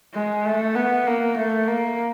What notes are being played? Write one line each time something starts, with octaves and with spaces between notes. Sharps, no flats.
G#3
A3
B3
A#3
A3
A#3